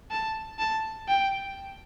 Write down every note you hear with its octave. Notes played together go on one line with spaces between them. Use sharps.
A5
A5
G5